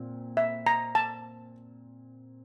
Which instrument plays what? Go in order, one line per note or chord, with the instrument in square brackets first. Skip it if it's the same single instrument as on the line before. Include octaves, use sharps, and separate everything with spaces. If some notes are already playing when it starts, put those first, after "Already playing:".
Already playing: [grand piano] A#2 C4
[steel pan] E5
A#5
A5